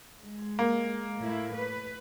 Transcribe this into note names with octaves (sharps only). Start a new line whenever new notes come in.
G#3
A#3
A2 E4
B4